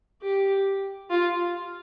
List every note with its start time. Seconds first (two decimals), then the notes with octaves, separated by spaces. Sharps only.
0.22 G4
1.10 F4